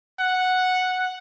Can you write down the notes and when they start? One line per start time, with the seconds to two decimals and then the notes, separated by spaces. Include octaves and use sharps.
0.20 F#5